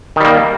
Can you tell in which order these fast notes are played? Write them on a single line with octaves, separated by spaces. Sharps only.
D#3 G3 A#3